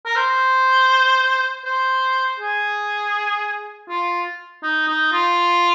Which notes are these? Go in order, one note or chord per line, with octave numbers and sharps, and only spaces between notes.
A#4
C5
C5
G#4
F4
D#4
D#4
F4